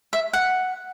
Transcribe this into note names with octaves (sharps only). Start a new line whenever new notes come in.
E5
F#5